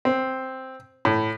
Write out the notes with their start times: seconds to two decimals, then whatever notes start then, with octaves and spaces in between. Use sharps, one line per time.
0.05 C4
1.05 A2